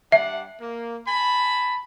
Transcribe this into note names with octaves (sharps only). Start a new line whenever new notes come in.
G3 D4 E5 F#5
A#3
G#5 A5 B5